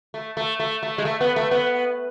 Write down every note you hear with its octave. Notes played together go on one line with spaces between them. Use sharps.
A3
A3
A3
A3
G#3
A3
B3
A3
B3